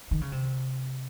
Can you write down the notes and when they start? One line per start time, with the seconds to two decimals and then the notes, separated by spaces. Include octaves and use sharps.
0.11 D#3
0.21 C#3
0.32 C3